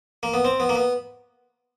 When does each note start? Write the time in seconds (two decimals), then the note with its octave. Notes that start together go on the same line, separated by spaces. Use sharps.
0.23 A#3
0.34 B3
0.45 C4
0.60 B3
0.69 A#3
0.75 B3